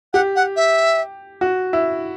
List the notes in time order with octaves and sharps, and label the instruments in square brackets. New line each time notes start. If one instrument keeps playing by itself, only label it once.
[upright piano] G4 [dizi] F#5
[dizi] F#5
E5
[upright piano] F#4
E4